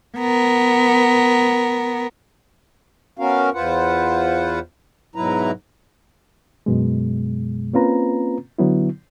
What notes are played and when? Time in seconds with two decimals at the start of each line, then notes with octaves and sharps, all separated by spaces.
0.17 B3 A#4
3.19 B3 C#4 F#4 A#4 F5
3.54 E2 F4 B4 C5 F#5
5.15 G#2 B2 F#3 E4 B4 A#5
6.66 F#2 B2 G#3
7.73 A#3 C4 C#4 F4 B4 A#5
8.59 D3 F#3 B3 E4